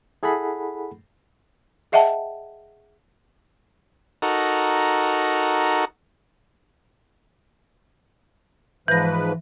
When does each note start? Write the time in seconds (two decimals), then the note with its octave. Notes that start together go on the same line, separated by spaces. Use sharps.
0.23 E4 G#4 A4 F#5 B5
1.92 G#4 D#5 E5 F#5 G5 A5
4.22 D#4 F#4 A4 A#4
8.88 G#2 E3 F3 B4 A#6